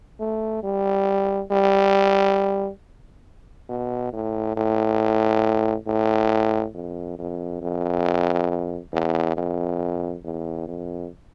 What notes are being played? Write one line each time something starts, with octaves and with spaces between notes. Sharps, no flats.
A3
G3
G3
B2
A2
A2
A2
F2
F2
F2
E2
F2
E2
F2